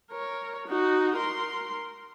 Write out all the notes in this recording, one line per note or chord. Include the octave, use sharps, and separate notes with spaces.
A#4 C#5
D#4 F#4
A#4 C6